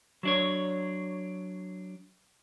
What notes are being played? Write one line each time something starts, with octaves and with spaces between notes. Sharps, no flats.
F#3 D4 C#5